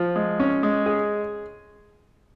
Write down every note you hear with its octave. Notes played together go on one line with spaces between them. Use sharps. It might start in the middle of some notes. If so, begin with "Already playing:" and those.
Already playing: F3
G#3
C#4
G#3
G#4